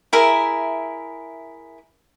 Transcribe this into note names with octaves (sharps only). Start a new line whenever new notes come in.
E4 G#4 A#4 E5